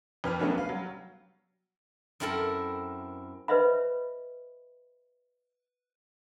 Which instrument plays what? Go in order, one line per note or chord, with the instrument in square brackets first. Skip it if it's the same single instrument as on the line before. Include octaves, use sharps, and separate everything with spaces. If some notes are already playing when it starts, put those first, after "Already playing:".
[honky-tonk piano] F2 B4 F6
F#3 A3 B3 C#4 D4 F#4
B4 F5
F#3 G3
[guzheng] F#2 C4 E4 A4 A#4
[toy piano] B4 C5 D#5 E5 B5